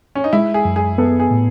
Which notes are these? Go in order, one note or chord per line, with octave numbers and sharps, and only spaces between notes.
C#4
D#4
G#3 E4
G#4
F#2
G#4
B3 A4
G#4
A2